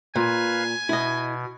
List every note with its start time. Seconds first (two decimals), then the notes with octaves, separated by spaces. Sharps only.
0.16 A#2 B4 F5 G#5
0.89 B2 E4 D#5